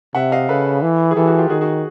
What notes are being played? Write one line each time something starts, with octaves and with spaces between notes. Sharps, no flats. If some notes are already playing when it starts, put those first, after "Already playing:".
C3 E5 F#5
D#5 F5
C#3 A4 B4
E3
G#4
E3 G4 A4
F#4 G#4
F4 G4
D#3 F#4 G#4
F#4 G#4